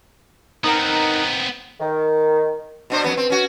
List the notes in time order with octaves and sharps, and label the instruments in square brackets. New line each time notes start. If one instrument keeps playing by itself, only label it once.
[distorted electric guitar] B3 C4 [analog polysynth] D#4 A#4 F#5
[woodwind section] D#3
[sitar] B2 D4 C5
F2 F#3 B3
C4
C#4 F#4